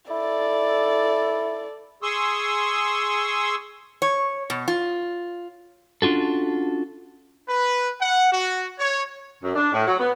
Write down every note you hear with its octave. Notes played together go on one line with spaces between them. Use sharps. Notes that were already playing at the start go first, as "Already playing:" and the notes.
E4 A4 D5
G#4 C6 C#6 D#6 E6
C#5
B2
F4
C#4 D4 F4 F#4 A4
B4
F#5
F#4
C#5
F#2
D4
A2
F#3
B3